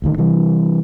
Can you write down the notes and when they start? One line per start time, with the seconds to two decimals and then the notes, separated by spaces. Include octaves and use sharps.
0.02 D#1 D2 D#3
0.18 C3 E3 G3